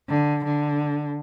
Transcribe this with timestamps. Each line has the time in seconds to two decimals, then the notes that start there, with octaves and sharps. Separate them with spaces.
0.09 D3
0.44 D3